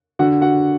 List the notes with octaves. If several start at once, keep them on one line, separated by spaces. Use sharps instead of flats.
D3 F#4 F#5
F#4 F#5